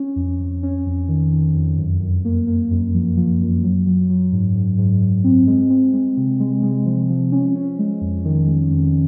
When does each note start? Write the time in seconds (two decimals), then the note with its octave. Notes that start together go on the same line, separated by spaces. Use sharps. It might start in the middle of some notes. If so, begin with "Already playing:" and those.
Already playing: C#4
0.16 F2
0.40 F2
0.63 C#4
0.86 F2
1.08 D#3
1.32 D#3
1.55 F2
1.78 F#2
2.01 F#2
2.25 A#3
2.47 A#3
2.71 F#2
2.94 F3
3.17 F3
3.40 F#2
3.63 F#3
3.86 F#3
4.09 F#3
4.32 G#2
4.55 G#2
4.78 G#2
5.02 G#2
5.24 C4
5.47 G#3
5.70 C4
5.94 G#3
6.17 C3
6.40 G#3
6.63 G#3
6.86 F3
7.09 F3
7.32 C#4
7.55 C#4
7.79 G#3
8.01 F2
8.25 D#3
8.48 G#3
8.71 F2